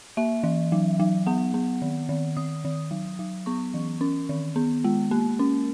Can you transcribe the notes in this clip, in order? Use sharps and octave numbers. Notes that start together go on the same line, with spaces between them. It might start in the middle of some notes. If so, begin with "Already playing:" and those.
A#3 E5
E3
F#3
F#3
B3 F#5
B3
D#3
D#3
D#3 D#6
D#3
F#3
F#3
B3 C#6
E3
C#4
D#3
B3
G#3
A#3
C#4